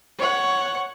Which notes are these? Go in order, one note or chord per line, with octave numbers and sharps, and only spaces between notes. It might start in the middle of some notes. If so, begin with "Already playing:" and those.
C#5 F#5